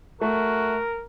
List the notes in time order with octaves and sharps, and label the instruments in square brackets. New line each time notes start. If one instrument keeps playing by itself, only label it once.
[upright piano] A3 [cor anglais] F#4 [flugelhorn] A#4